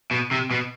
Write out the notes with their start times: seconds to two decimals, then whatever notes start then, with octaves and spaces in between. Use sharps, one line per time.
0.11 B2
0.31 C3
0.51 B2